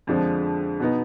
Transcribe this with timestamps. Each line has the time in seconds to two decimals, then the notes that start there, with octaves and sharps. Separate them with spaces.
0.07 F2 D3 F3 G#3
0.80 B2 B3 D#4